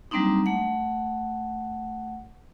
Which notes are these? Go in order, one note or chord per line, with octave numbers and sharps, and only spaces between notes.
F#3 G3 A#3 C4 D4 D#4
A3 F#5